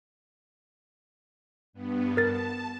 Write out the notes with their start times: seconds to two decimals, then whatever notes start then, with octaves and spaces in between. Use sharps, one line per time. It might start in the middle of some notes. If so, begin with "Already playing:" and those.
1.73 G2 B3
2.17 A#4 A5 A6